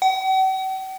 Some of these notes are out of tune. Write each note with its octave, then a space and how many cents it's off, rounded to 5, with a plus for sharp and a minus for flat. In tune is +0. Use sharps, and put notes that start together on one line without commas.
F#5 +45